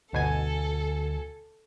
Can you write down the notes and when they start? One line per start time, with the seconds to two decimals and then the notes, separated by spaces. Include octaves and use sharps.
0.13 G1 D2 B2 A4 G#5